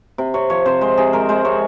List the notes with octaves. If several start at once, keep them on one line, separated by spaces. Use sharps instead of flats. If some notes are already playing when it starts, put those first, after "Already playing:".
C3
C3 C#5
F3 C#5
C3 C5
G#3 C5
C3 G#4
G#3 A#4
G#3 C5
C3 C#5